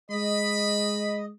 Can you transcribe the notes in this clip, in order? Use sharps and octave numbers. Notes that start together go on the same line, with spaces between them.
G#3 D#5 B5